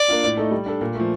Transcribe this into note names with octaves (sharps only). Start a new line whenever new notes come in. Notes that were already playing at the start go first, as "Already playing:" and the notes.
Already playing: D5
A#3 D4 F4
A2
A3 D#4 A4
G3
D4 A4
A#2
F3 A3